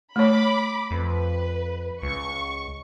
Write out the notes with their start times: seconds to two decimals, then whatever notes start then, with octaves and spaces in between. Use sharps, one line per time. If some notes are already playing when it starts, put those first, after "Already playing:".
0.16 A3 C#5 B5 D6
0.91 F2 B4
2.02 C#2 C#6